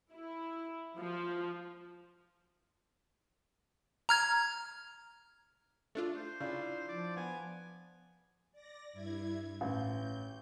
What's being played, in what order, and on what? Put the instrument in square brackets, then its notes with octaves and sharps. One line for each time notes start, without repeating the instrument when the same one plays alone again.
[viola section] E4
F3
[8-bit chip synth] A#5 F6 G#6
[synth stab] A3 D4 F4
[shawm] C5
[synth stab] C#3 [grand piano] D4 E4 F4
[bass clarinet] F3 [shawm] D5
[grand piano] B3 [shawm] G#5
[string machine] D5 A#6
G2 E4 G#6
[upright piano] A1 [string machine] G6